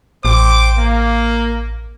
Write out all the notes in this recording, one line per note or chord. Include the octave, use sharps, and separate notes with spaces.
A1 C5 G5 D6
A#3